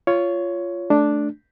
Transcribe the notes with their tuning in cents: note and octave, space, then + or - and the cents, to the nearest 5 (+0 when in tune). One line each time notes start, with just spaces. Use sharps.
F4 -10 C#5 +10
A3 -15 D4 +0